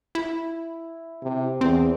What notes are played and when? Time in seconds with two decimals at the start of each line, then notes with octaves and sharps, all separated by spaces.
0.15 E4
1.23 C3
1.61 E2 C4